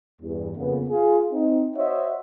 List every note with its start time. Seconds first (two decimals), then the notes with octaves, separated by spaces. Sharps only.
0.22 E2 G2
0.57 F2 C#3 A#3 B3
0.89 F4 G#4
1.32 C4 D#4
1.76 F#4 C5 C#5 D#5 E5 F#5